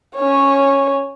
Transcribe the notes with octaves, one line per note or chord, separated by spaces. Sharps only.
C#4 C#5